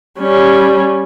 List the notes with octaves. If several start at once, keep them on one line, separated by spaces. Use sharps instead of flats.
G3 C#4